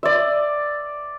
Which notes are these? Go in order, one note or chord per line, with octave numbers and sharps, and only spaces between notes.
D5 E5